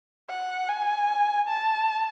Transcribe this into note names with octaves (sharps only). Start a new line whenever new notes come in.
F#5
G#5
A5